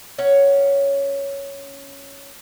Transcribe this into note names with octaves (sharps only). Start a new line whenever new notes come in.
C#4 C#5 F#5